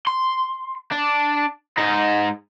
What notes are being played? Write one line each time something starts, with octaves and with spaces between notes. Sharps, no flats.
C6
D4
G#2 D#4